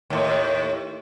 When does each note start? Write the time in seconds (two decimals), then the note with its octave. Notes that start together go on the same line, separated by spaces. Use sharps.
0.10 D#2 A2